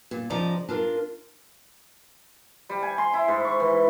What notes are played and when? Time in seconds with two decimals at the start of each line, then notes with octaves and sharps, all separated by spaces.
0.11 A#2
0.30 C#3 F3 D5 D#5 A#5
0.69 D4 F4 A#4
2.69 G3
2.83 G#5
2.98 C6
3.13 E4
3.28 G#2
3.45 C#6
3.60 E3